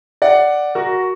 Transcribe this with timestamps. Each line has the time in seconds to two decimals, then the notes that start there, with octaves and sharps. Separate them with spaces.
0.22 D5 F#5
0.75 F#4 A#4